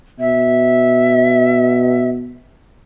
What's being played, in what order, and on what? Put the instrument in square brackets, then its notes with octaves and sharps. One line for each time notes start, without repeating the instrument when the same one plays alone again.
[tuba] B2 [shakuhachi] E5